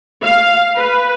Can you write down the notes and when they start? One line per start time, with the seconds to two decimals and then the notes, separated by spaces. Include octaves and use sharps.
0.23 F5
0.77 B4